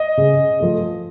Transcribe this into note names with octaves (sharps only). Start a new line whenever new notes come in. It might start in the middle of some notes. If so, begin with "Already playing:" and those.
Already playing: D#5
C#3
F3 A3